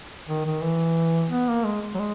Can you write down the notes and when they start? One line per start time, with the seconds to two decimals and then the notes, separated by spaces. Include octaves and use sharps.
0.28 D#3
0.45 D#3
0.62 E3
1.30 B3
1.48 A#3
1.64 G#3
1.94 F#3
1.99 G#3